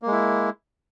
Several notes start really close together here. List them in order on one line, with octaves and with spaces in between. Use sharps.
A#3 G#3 E4